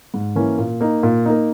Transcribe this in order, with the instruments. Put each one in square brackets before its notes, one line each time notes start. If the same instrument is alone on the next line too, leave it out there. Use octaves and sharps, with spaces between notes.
[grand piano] G#2
E3 A#3 C#4
A#2
A#3 D#4
A#2
A#3 D#4